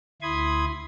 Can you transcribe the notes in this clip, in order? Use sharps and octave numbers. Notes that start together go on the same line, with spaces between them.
D2 E4 B5 C6 D#6 G#6